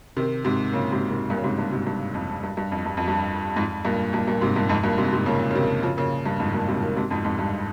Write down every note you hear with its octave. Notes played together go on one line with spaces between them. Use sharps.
C3 D#3
G#2 C3
A#2 C#3
G#2 C3
G#2 C3
G2 A#2
C#3
G#2 C3
G2 A#2
G#2 C3
G2
F2
G2
G2
F2
G2
F2
G2
F2 G#2
G2 A#2
G2 A#2
G2 A#2
G#2 C3
G2 A#2
F2 G#2
G2 A#2
G#2 C3
G#2 C3
A#2 C#3
C#3
C3 D#3
C#3 F3
A#2 C#3
G2
F2 G#2
G2 A#2
G#2 C3
C3 D#3
G#2 C3
F2 G#2
F2 G#2
G2